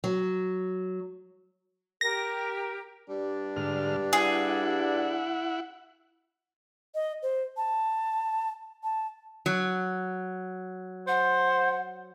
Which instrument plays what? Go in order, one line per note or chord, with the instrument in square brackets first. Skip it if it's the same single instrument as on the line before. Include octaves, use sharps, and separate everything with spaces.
[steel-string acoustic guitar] F#3
[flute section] G4 A#4 [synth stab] A#6
[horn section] G2 G3 D4
[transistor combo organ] G#2 D3 F6
[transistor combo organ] E4 F#5 [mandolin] G#4
[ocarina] D#5
C5
A5
A5
[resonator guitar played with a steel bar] F#3
[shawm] C5 [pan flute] F#5